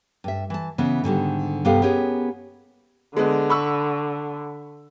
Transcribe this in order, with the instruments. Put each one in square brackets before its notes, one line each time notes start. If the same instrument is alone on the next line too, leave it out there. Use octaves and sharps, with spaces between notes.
[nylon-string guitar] G2 E5
E3 A5
C#3 E3 B3
G#2 D3 D#3 G3
G2 C3 B3 G4 A4 F5
B3 C#4 G4 G#4 A#4
[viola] D3 [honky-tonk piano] G#3 B3
[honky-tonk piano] B5 C#6 E6